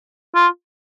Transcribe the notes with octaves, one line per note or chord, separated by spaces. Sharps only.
F4